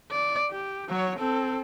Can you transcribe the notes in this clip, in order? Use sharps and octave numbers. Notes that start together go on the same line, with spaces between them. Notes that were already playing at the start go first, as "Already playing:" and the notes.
D5
G4
F#3 C#5
C4 A4